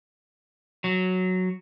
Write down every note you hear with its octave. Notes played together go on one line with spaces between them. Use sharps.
F#3